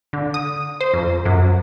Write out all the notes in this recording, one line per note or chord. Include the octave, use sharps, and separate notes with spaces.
D3
D#6
C5
F2
F#2